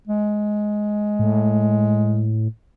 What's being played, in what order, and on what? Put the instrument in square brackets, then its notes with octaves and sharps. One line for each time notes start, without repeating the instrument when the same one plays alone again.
[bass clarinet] G#3
[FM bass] A2